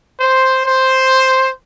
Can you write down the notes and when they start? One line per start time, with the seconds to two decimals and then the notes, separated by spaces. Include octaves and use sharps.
0.20 C5
0.66 C5